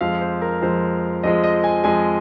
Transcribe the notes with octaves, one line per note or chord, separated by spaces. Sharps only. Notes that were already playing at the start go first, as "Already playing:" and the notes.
F2 F3 G#3 F5
C5
A#4
F2 F3 G#3 C5
F2 F3 G#3 D#5
D#5
G#5
F2 F3 G#3 G#5